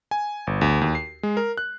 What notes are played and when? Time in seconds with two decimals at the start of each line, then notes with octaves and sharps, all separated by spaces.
0.11 G#5
0.47 G1
0.61 D2
0.81 D#2
0.95 C7
1.23 G#3
1.37 A#4
1.58 F#6